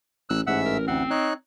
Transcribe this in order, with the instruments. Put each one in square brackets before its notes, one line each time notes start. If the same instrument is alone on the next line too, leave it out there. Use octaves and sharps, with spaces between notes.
[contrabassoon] A1 [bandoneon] E6 F#6
[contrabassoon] A1 [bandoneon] G#2 E5 E6 [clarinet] F#5
[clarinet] A#4
[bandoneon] D2 F#5 [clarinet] C4
[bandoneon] D#4 C#5 F#6